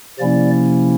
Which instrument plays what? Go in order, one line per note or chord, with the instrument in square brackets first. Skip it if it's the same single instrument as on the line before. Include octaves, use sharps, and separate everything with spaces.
[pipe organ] C3 F3 A#3 C#4 E4 D5